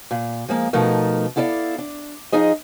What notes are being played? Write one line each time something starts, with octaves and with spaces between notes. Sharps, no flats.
A#2
F3 G#3 A#3
B2 F3 A3 D#4 A#4
B3 E4 A4 D5 D#5 F5
D4
F3 D#4 G#4 D#5